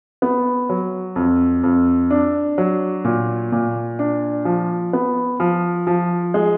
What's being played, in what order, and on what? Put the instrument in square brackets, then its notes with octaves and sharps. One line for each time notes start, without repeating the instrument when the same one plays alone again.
[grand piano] B3
F#3
F2
F2
D4
F#3
A#2
A#2
D4
F3
B3
F3
F3
G#3